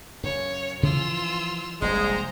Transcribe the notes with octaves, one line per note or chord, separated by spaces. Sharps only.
F#2 C#3 C#5
C#3 E3 F3 F4 E6
F1 A#1 G3 G#3 C5 A#5